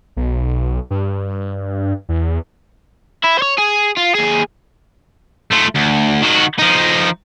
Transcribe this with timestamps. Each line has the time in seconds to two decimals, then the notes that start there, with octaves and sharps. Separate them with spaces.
0.17 B1
0.90 G2
2.09 E2
3.24 E4
3.39 C5 C#5
3.58 G#4
3.97 F4
4.15 D#2 G#4
5.51 A3 F4
5.75 D2
6.22 D#3 F#4
6.59 F3 D#4